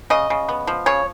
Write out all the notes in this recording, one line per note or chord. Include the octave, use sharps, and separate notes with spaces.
C#3 D#5
C#3
B3
F3
C#3 C#5